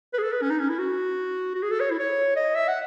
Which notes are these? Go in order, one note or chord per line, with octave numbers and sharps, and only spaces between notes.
B4
G#4
A4
B4
C#4
D#4
C#4
E4
F#4
F#4
G#4
A4
C#5
E4
C#5
D#5
E5
F#5